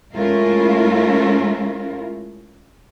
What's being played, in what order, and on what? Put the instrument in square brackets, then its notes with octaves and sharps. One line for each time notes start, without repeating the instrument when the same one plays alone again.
[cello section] G#3 A3 C#4 E4 F4 A#4